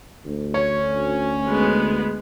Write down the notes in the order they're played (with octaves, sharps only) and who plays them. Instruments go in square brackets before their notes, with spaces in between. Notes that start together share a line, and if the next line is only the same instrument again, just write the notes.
[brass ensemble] D2
[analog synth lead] C#4 [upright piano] C#5
[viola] G#3 B3